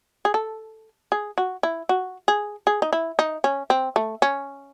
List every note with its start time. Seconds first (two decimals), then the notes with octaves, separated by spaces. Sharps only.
0.25 G#4
0.34 A4
1.12 G#4
1.38 F#4
1.63 E4
1.89 F#4
2.28 G#4
2.67 G#4
2.82 D#4
2.93 E4
3.19 D#4
3.44 C#4
3.70 C4
3.96 A3
4.22 C#4